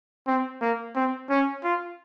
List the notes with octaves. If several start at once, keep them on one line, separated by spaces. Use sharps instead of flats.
C4
A#3
C4
C#4
F4